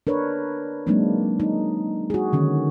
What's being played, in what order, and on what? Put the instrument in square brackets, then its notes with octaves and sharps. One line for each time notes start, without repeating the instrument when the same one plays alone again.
[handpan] D4 A#4 B4 C#5
F#3 G#3 A#3 C4 D4 D#4
D#4
F#4 G#4
D3 D#3 C#4